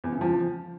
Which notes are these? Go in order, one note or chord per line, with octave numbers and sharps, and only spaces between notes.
E2
C#3
F3